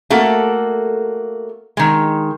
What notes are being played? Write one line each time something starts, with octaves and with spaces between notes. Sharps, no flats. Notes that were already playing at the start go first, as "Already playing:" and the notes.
A3 A#3 F#4 A4
D#3 G#3